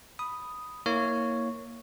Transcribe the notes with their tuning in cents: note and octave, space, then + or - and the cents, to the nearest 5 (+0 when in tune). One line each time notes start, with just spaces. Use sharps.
B5 +0 D#6 +0
A#3 +0 E4 -25 C#5 +0